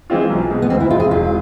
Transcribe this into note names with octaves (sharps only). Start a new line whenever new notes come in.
E3 G#3 C4 F4
B1
B2 G#3
B3
D2 C4
E4
C3 G#3 F4
G#4
E1 F4